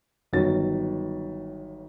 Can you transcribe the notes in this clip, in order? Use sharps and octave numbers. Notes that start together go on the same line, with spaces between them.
G1 D#3 F#3 A6